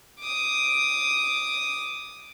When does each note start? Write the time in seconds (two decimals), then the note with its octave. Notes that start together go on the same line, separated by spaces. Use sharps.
0.19 D6 D#6